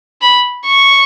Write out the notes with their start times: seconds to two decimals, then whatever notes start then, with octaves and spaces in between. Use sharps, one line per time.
0.21 B5
0.66 C#6